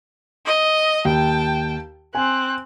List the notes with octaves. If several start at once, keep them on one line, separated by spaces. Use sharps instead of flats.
D#5
D#2 G5 A5
C4 G#5 F#6